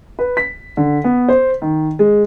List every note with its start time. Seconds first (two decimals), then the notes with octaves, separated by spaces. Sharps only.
0.19 B4
0.37 B6
0.77 D3
1.04 B3
1.29 C5
1.62 D#3
1.99 G#3